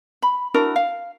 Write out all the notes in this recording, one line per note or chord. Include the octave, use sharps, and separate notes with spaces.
B5
D4 E4 F#4 A#4
F5